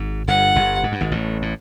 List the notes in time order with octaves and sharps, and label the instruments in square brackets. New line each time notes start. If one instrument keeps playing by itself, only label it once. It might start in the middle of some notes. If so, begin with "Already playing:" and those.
Already playing: [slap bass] G#1 G#2
[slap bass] G1 G2 [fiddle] F#5
[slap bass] G1 G2
G#2
G2
G#1 G#2
A1 A2
A2